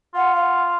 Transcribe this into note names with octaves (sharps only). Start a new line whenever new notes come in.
F4 F#5
F5
F#5